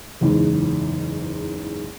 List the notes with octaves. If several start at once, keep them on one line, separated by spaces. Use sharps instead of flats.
F#1 E2 G#2